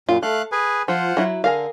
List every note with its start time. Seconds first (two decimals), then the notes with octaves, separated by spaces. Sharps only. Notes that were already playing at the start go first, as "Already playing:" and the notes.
0.09 F#2 A#2 F4
0.23 A3 A4 F5 F#6
0.52 G#4 B4 G#5
0.88 F3 F4 C5 F#5
1.17 F#3 E4
1.44 D3 G#4 A#4 F5